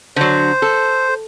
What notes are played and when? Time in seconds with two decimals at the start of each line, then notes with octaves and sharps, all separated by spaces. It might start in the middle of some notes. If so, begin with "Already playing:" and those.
0.16 D3 F#3 C5
0.62 A4